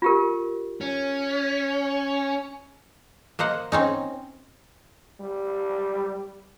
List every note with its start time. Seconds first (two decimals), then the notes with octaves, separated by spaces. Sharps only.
0.02 F4 G4 A#4
0.81 C#4
3.39 A#3 C5 D#5 F#5
3.72 C4 C#4 D#4
5.20 G3